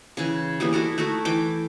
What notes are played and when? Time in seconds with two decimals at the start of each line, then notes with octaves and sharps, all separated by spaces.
0.17 C#3 E3
0.60 E3 G3 A#3 B3
0.73 E4 F#4 A4 A#4
0.98 A3 D#4 E4 F#4
1.25 E3 G5 D6